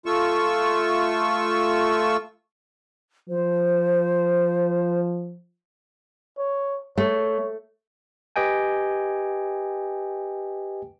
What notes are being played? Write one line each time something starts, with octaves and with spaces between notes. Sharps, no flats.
A3 F4 C#6 E6
F3 C5
C#5
A3 C#5
G4 B4 D#5 G5 G#5